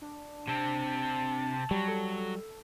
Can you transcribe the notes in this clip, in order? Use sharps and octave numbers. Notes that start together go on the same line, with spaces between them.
D4
C3 C4 A5
F#3 G3 C#6
A4